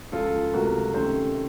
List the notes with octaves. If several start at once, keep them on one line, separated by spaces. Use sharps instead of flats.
C#2 C#3 F3 F4 A4
C#2 C3 F#3 A3 F#4 A#4
C3 D#3 A3 C#4 A4 C5